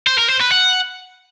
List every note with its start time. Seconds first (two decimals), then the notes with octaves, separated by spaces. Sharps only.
0.07 C5
0.18 A#4
0.29 C5
0.41 B4
0.52 F#5